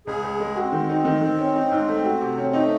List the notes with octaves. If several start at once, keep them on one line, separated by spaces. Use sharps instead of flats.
C#2 G#4
C#2
G#3
C4 F#4
D#3
D#4
D#3
D#3
C#4
D#4
G#2
A3
F#4
C3
C#4
A3 D#4